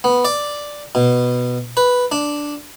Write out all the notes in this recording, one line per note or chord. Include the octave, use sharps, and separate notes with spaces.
B3
D5
B2
B4
D4